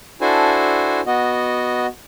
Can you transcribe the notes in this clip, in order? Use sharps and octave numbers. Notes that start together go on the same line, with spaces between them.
D4 E4 F#4 A4 C5 G#5
B3 F#4 D#5